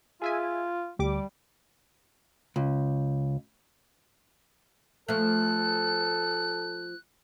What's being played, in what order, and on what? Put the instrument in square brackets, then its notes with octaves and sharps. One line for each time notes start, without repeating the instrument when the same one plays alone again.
[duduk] F4 [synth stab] G#4 E5 G#5
[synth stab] D2 G4 D6 [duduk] G3
[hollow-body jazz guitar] C#2
[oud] F3 A3 [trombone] A4 [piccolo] F#6